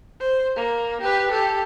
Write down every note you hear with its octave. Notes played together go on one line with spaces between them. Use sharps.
C5
A#3
G4 B4
G4 A4